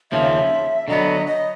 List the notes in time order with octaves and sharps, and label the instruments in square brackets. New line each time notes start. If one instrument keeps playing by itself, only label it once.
[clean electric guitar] D#2 C#3 F3 [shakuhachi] E5
[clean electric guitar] D3 F#3 B3 [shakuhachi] D#5
[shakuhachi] D#5